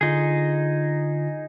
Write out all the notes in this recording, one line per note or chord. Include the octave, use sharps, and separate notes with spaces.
D3 D#4 F4 G#4